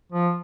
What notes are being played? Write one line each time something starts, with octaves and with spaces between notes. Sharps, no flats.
F3